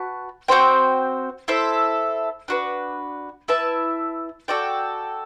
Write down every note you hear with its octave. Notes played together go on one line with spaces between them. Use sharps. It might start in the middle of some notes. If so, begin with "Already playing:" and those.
Already playing: F#4 B4 A5
C4 F#4 C5 G5
E4 A4 C5 E5
D4 F#4 B4
E4 B4 E5 A5
F#4 A4 D5 G5